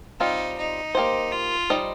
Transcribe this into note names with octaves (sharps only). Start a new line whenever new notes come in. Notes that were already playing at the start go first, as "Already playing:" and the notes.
G3 C4 D#4 F4
D#4
A#3 G4 C5
F4
G3 D#4 C5 D#5